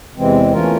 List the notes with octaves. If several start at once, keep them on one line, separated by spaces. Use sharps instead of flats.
E2 C3 E3 G#3 C4
E3 A3 C#4 F4 A#4